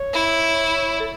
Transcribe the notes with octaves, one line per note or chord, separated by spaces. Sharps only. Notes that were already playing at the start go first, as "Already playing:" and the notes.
Already playing: C#5
E4
A4